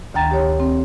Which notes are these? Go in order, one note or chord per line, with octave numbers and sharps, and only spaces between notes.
D2 D#3 G5 A#5 A6
G4 C#5
C4